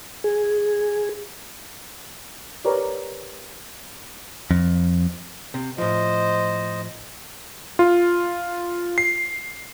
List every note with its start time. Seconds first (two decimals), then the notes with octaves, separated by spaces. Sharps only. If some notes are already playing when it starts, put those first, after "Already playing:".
0.24 G#4
2.65 G4 A#4 B4 C#5 D5
4.51 F2
5.54 C3
5.78 A2 F3 C5 D#5
7.79 F4
8.98 C7